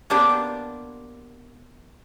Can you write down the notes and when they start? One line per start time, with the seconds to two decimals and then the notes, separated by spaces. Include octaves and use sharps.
0.10 A#3 B3 D4 G4 C5